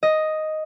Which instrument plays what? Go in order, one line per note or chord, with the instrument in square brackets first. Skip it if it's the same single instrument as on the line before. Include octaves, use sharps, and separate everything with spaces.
[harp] D#5